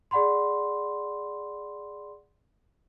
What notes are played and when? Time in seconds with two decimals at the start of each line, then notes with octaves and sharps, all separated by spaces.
0.11 G#4 D5 F#5 B5 C6